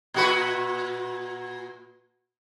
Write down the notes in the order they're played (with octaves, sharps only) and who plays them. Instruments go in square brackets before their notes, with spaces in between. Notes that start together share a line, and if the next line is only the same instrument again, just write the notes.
[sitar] A#2 F#4 B4